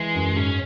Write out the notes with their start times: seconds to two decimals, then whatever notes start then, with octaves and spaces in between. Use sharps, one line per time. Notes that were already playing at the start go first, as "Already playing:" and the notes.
Already playing: E3 G#3
0.15 F#2
0.36 G#2 C#4